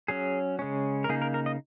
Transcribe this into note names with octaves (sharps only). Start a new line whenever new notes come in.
F#3 C#4 G#4
C#3 G#3 C#4
A#4
C#3 A#3 D#4 G#4
A#4
A#4
D#5